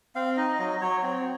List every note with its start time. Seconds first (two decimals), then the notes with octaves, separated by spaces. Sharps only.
0.15 C4 F5
0.37 D#4 D#5
0.59 F#3 D#5
0.81 F#3 C#5
1.03 C4 C#5